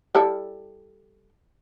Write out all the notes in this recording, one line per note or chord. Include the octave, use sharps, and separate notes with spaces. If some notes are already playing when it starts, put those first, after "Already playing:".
G3 E4 A4